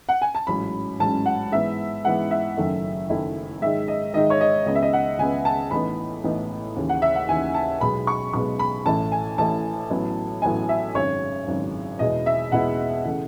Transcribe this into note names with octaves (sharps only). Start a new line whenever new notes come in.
F#5
G#5
A5
A1 G#2 F#3 C#4 B5
A1 G#2 F#3 C#4 A5
F#5
G#2 E3 B3 E5
G#2 E3 B3 F#5
E5
F#1 F#2 D#3 A3 E4
F#1 F#2 D#3 A3 E4
G#2 D#3 G#3 D#4 E5
D#5
G#2 D#3 G#3 D#4 D#5
C#5
D#5
C#2 C#3 G#3 B3 D#5
E5
D#5
F#5
C#2 C#3 G#3 B3 G#5
A5
A1 A2 E3 B3 D#4 B5
A1 A2 E3 B3 D#4
D#2 C#3 E3
F#5
E5
F#5
D#2 C#3 E3 G#5
A5
B1 B2 G#3 B3 B5
C#6
B1 B2 G#3 B3 C#6
B5
A1 A2 E3 A3 E4 A5
G#5
A1 A2 E3 A3 E4 A5
A1 A2 F#3 B3 E4
A1 A2 F#3 B3 E4 G#5
E5
G#1 F#2 C#3 C#5
G#1 F#2 C#3
E2 B2 G#3 B3 E4 D#5
E5
E2 B2 G#3 B3 E4 F#5
C#3 E3 A3